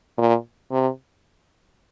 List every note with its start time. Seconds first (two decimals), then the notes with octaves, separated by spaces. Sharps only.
0.18 A#2
0.72 C3